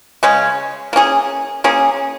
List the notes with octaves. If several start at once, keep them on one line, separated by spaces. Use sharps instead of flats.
C#3 G#3 C#4
A#3 C#4 G#4
A#3 C#4 G#4